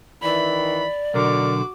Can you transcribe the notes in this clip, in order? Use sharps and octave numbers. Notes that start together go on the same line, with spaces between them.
D#3 E3 D5 B5
B1 D3 F#4 A#4 D6